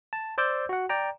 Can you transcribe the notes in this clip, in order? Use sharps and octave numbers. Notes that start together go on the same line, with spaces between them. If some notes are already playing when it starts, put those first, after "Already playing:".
A5
C5 D5 D6 E6 G6
F#4 F#5
D5 G5 A#5